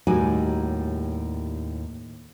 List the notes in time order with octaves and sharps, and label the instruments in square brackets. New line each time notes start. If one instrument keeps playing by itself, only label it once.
[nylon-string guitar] D#2 A2 G3 D#4 F#4 G#5